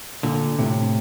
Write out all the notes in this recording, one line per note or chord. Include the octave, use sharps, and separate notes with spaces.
A#2 D3
A2 C3